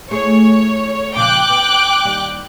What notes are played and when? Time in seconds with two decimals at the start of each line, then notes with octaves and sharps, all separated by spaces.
0.11 A3 E4 G#4 C#5
1.15 A#2 C#3 F3 G5 D6 F#6
1.49 B3
2.04 D#2 G3